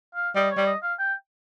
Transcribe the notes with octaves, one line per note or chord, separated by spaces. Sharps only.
F5
G3 D#5
C#5
G3
D#5
F5
G5